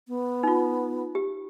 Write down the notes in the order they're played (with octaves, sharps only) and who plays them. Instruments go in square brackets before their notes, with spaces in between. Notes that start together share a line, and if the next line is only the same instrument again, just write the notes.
[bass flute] B3
[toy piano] D#4 F4
G4